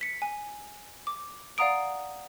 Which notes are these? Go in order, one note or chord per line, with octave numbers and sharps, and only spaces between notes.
B6 C#7
G#5
D6
D5 F5 F#5 A#5 D#6 D7